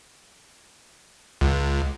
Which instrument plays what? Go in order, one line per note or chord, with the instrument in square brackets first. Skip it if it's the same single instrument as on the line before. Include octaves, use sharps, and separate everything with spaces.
[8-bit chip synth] C#2